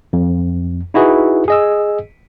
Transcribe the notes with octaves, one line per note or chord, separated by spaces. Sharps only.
F2
D#4 E4 F#4 G#4 B4
G#4 D#5 E6